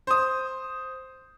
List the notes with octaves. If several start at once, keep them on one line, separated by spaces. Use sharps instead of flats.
C5 D#6